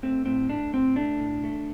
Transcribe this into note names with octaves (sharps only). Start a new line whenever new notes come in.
A3 C4
A2 C4
A3 D4
A2 C4
A3 D4
A2
A3